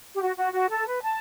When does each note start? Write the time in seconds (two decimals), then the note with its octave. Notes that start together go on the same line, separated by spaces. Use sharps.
0.14 G4
0.21 F#4
0.37 F#4
0.53 F#4
0.69 A4
0.85 B4
1.01 A5